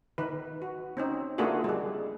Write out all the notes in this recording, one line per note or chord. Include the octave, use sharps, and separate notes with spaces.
D#3 B4
F#4
C4 C#4 D#4
A3 A#3 D4 F4 F#4 G#4
G3 G#3